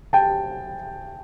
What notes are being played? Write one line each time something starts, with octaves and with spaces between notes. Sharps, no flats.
G5 A5